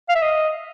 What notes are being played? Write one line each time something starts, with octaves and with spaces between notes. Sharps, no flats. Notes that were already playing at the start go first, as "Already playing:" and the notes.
F5
E5
D#5